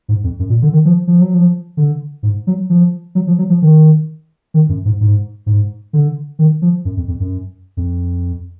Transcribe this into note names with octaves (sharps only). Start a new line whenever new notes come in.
G#2
F2
F#2
A#2
D3
D#3
F3
F3
F#3
F3
D3
G#2
F#3
F3
F#3
F3
F#3
F3
D#3
D#3
F#2
G#2
G#2
G#2
D3
D#3
F3
F#2
F2
F2
F#2
F2